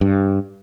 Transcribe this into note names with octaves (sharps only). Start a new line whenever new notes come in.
G2